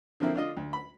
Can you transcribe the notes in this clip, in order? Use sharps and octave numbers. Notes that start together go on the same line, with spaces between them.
D3 F3 A#3 C4 E4
D3 D4 F4 D#5
D2
B5